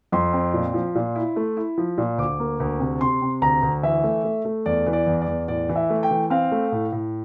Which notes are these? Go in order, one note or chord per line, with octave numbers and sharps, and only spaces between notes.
F2 C6
C4
A#2
F3
A#2
E4
A3
E4
F3
A#2
D2 D6
A#3
D2
C3
C3 C6
C3
D2 A#5
D2
E3 E5
A3
A3
A3
E2 D5
E3
D5
E2
D5
E2
A2 D5
E3
E5
A3
G5
E3
C4 F5
A3
A2
A2